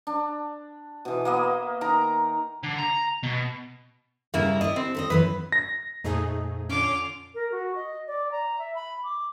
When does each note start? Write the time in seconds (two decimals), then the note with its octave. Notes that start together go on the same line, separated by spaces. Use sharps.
0.07 D4
1.05 B2 E3
1.25 A#3 B3 D#5
1.81 D#3 A#4 A#5
2.63 D3
2.79 A#5
3.23 B2
4.34 G2 C#3 A#3 E4 A#4
4.61 D4 E4 G4 D#5
4.76 C4
4.95 A4 A#4 D#5
5.10 F#2 E3 B3 B4
5.52 A#6
6.04 F2 A#2 A3 D#4 G#4
6.69 D3 C#4 F4 D6
7.35 A#4
7.52 F#4
7.75 D#5
8.07 D5
8.32 A#5
8.59 E5
8.75 B5
9.04 D6